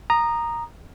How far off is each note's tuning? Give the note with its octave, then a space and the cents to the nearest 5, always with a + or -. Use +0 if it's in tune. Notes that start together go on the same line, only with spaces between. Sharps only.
A#5 +0 D#6 -20